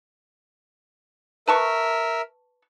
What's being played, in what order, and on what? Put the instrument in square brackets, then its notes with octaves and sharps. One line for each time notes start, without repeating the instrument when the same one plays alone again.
[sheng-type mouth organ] A#4 E5 [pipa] B4 A5 C#6